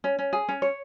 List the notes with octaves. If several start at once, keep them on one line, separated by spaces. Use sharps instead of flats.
C#4
C#4
G#4
C#4
C#5